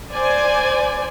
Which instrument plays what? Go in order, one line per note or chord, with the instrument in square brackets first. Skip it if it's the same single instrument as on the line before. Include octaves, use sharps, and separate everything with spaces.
[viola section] C5 D5 G#5